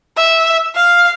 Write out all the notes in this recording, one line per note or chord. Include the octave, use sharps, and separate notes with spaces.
E5
F5